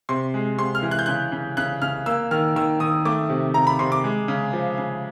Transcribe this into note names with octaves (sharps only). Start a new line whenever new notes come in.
C3 C6
G#3
C3 C6
F6
E3
F#6
G6
C#3 F#6
C#3
C#3 F#6
C#3 F6
A#3 E6
D#3 F6
D#3 E6
D#3 D#6
A3 D6
C3
C3 A#5
B5
C3 C6
D6
G#3
C#3
F3
C#3